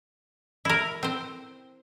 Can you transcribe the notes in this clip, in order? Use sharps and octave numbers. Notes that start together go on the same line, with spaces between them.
E4 A#4
C4 C5